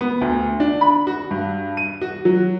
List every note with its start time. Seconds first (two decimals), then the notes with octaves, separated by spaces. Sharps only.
0.01 B3
0.21 D2
0.60 D4
0.81 B5
1.07 F#4
1.31 G2
1.77 D#7
2.01 F#4
2.25 F#3